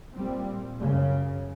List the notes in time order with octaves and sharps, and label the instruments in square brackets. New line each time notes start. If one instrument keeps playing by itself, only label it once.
[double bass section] A#2 G3 C4
F#2 C#3